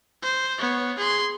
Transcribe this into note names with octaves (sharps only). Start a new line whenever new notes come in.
C5
B3 C#5
G#4 C6